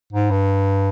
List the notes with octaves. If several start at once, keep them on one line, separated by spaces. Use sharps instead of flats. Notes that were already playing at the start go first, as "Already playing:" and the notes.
G#2
G2